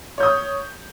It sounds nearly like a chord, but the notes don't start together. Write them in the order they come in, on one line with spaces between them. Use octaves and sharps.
C#5 G6 D#6